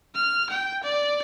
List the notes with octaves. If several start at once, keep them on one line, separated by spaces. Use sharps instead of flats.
F6
G5
D5